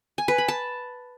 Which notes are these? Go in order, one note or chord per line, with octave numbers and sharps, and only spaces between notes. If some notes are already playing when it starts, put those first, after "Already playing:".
G#5
B4
B5
A5